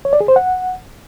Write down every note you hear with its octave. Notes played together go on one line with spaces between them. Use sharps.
C#5
D5
G#4
C5
F#5